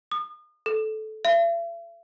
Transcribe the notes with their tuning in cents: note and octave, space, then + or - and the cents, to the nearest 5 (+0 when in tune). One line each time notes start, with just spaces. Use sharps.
D#6 -35
A4 -20
E5 +45